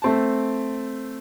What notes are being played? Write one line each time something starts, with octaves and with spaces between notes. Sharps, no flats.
A3 C4 A5